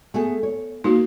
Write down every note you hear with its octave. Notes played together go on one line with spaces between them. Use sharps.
A3 B3 G#4
C#5
A#3 D#4 F#4